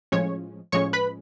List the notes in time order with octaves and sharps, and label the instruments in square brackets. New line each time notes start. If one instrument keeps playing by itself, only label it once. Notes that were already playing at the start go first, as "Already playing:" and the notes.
[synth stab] A2 F3 G#3 C#4 C#5
A2 F3 G#3 C#4 C#5 C#6
B4 B5